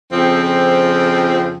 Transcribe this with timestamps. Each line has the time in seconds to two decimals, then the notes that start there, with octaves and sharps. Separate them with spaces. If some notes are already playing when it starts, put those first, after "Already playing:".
0.11 F2 C#3 F3 C4